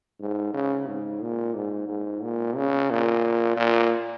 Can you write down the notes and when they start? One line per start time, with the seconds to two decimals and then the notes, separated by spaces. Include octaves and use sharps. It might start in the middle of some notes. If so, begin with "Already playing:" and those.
0.20 G#2
0.54 C#3
0.87 G#2
1.22 A#2
1.55 G#2
1.89 G#2
2.23 A#2
2.56 C#3
2.91 A#2
3.57 A#2